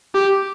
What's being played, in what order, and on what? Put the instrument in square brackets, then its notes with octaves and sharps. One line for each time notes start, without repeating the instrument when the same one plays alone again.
[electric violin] G4